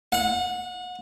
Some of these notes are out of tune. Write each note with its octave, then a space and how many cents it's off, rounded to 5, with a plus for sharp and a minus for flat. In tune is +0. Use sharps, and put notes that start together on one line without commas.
F#5 -30